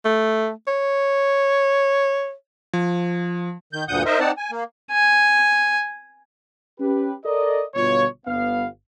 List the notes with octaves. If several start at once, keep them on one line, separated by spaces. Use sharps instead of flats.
A3
C#5
F3
D#3 G6
D2 G2 A#2 F#5 D#6 G6
D#4 A#4 C5 D#5 E5
C4 D#4 D5 F#5 A5
G#5
A#3
G#5
C#4 G4 B4
A4 A#4 D5 D#5
G1 B2 F4 C#5
G1 B3 F5